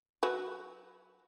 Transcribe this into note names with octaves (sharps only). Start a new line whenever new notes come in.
F#3 F#4 B4